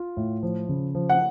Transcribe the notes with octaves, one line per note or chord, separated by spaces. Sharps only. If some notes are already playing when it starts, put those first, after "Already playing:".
Already playing: F4
A2
F3
C#3
F3
F#5